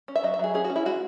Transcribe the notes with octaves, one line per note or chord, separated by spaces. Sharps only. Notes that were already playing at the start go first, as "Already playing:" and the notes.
C#4
E5
F#3 D#5
E5
F#3 G#4
C#4 G#4
F#4
C#4
E4
G#3 F#4